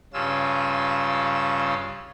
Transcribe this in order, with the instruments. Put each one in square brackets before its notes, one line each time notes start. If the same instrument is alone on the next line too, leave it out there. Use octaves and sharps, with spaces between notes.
[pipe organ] G2 C#3 C#4 F4 E6